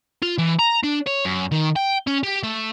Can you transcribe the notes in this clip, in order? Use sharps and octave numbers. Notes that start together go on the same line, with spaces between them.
F4
E3
A#5
D4
C#5
F#2
D#3
G5
C#4
G4
A3